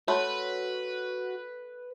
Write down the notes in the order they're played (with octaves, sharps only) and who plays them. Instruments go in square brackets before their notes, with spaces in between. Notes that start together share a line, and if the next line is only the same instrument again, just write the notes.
[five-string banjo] A3 [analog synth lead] F#4 [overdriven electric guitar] B4 [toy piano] C#5 C6